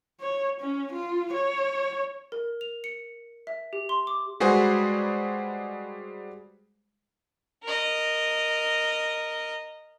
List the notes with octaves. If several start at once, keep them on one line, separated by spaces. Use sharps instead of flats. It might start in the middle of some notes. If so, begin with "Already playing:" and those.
C#5
C#4
F4
C#5
A#4
F7
C#7
E5
G4
C6
D6
G3 G#3 F#4 G#4 B4 C5
A#4 D#5